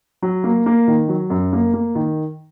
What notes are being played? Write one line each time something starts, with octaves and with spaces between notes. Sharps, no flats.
F#3
A#3
A#3
D#3
F#3
F#2
A#3
A#3
D#3